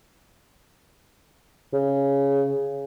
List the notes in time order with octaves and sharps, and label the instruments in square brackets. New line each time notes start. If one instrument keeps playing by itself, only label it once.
[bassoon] C#3